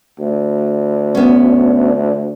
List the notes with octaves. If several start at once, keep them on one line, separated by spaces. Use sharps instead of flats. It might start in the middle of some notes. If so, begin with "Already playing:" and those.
D2
B3 C#4